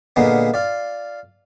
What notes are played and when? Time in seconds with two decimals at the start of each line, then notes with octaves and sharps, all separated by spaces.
0.16 A#2 D3 G#3 A#3 B3
0.54 F4 D5